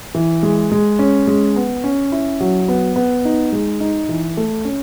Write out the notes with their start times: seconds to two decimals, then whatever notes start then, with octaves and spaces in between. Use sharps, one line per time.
0.15 E3
0.43 G#3
0.72 G#3
0.99 C#4
1.27 G#3
1.56 B3
1.84 C#4
2.12 E4
2.40 F#3
2.68 B3
2.96 B3
3.25 D#4
3.53 G#3
3.80 D#4
4.09 E3
4.37 A3
4.65 C#4